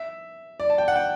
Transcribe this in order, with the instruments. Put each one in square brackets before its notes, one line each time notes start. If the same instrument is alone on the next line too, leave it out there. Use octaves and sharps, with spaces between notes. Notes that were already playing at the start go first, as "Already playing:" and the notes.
Already playing: [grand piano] E5
D5
A5
G5
F#5
G5